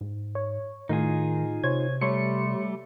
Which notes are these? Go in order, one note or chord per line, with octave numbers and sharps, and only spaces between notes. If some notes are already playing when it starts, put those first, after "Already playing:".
G#2
C#5
A2 D#3 D#4 F4 G#4
C3 C5 C#5 G#6
G3 A3 C#5 C6 C#7